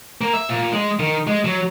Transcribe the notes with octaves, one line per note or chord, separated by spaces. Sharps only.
A#3
E5
A#2
G#3
D#3
G#3
F#3